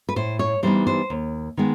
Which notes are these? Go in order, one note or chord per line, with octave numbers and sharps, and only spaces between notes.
B4
A2 C5
C#5
E3 G3 B3 D#4 C5
C5
D#2
D#3 G#3 B3